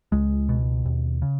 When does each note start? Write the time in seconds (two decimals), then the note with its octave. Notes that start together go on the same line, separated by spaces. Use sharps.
0.12 C#2 G#3
0.49 B2
0.86 D#2
1.22 C#3